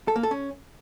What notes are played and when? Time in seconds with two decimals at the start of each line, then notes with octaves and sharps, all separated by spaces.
0.08 A4
0.16 A#3
0.23 A4
0.31 C#4